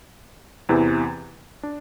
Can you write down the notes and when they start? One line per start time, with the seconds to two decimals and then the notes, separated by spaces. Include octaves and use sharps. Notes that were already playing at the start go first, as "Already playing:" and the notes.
0.69 E2 C3 E3
1.63 D4